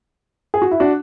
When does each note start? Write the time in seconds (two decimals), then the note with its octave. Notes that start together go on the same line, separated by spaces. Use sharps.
0.54 G#4
0.62 F#4
0.71 E4
0.80 D4 F#4